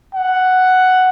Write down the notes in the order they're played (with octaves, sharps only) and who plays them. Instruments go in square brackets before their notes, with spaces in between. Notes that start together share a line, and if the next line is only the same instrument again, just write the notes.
[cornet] F#5